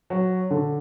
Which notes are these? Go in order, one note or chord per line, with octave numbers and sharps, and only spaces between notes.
F#3
D3